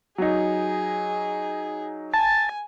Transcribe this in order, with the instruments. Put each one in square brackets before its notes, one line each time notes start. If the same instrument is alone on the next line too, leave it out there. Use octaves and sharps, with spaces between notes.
[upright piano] F#3 D#4 [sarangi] G#4
[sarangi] G#5 [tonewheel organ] A5